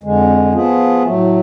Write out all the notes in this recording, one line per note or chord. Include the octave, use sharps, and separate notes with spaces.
F2 D3 G#3
F3 B3 F4 G#4
A2 F#3 A3